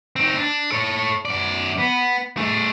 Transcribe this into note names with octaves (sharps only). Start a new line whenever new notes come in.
C4 D#4
D4
A4 C#5
F#2 D5
B3
A3 G#4